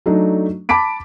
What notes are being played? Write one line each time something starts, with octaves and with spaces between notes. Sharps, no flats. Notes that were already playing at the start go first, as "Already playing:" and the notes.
F#3 A3 D4 D#4
A5 B5 D6 B6 D7